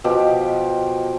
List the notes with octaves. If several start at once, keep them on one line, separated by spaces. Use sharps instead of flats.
B2 F3 G4